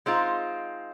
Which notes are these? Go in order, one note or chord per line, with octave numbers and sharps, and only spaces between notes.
G#3 C4 D#4 F4